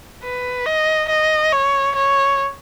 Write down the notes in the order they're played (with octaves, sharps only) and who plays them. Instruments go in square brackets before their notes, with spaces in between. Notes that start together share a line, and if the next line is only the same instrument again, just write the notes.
[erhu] B4
D#5
D#5
C#5
C#5